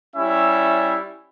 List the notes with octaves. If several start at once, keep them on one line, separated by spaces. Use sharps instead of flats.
G3 C#4 E4 E5